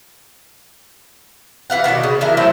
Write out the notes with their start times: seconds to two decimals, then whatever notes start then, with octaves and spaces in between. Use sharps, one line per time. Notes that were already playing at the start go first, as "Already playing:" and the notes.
1.70 E3 B4 F5 F#5
1.84 B2 D#3 C#4 D5
2.03 C#3
2.21 E3 D4 E4 A#4
2.37 F#3 A3 E4 C5